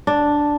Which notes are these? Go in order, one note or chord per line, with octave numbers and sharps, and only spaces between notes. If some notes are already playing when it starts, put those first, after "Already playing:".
D4